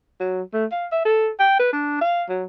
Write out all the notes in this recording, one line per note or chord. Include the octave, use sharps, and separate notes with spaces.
F#3
A3
F5
E5
A4
G5
B4
D4
F5
F#3